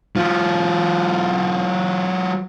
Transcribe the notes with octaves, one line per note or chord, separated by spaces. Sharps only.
F#3 F4